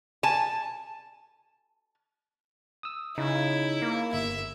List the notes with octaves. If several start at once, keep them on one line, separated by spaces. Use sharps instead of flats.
G#5 A5
D#6 E6
C#3 D#4 E4
A#3
G1 E5